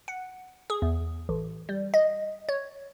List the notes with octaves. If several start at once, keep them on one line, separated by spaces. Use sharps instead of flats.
F#5
G#4
E2
A1
G3
D#5
C#5